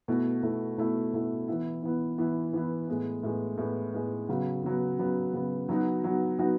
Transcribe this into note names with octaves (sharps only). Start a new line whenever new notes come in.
B2 A3 E4
B2 A3 E4
B2 A3 E4
B2 A3 E4
E3 B3 E4
E3 B3 E4
E3 B3 E4
E3 B3 E4
A2 G#3 B3
A2 G#3 B3
A2 G#3 B3
A2 G#3 B3
C#3 F#3 B3
C#3 F#3 B3
C#3 F#3 B3
C#3 F#3 B3
F#3 B3 D#4 F#4
F#3 B3 D#4 F#4
F#3 B3 D#4 F#4